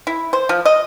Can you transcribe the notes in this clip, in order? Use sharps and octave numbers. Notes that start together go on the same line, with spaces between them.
E4
C5
F3
D#5